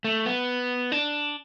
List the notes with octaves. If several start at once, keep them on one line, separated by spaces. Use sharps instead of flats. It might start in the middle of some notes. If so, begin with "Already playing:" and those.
A3
B3
D4